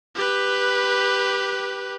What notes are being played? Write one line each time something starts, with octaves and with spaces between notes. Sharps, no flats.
G4 B4